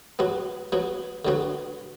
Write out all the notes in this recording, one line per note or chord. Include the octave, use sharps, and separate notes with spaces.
F#3 B3 F#4
F#3 B3 F#4
D3 F#3 B3 F#4